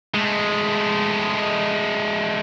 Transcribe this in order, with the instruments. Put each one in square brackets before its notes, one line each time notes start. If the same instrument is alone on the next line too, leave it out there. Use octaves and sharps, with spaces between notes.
[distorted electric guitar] G#3 A3